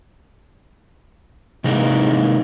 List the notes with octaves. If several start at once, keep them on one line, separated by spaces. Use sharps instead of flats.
C3 E3 G#3 A#3 D#4